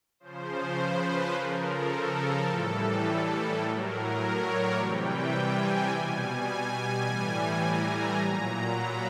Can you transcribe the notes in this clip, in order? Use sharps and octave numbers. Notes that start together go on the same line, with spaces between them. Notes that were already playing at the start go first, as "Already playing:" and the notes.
C#3 F3 C5
B4
C#3 F3 A#4
A4
A2 E3 G3 A4
A2 F#3 A#4
A#4
C#5
D5
C3 E3 G3 G5
G#5
B2 G3
G#5
A2 E3 G3
A#5
A#2 F#3 A#5
B5